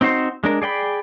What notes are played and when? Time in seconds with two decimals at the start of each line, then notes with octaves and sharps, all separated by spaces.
0.01 C4 D#4 F#4 C5
0.44 G#3 D4 A#4
0.62 G#4 D5 G5 B5